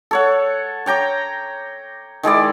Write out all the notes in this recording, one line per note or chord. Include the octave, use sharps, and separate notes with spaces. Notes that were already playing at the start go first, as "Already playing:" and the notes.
A4 C#5 F#5
C#5 G5 A#5 D6
D#3 G#3 E4 D5